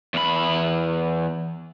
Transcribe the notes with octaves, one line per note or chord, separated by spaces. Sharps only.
E2 B5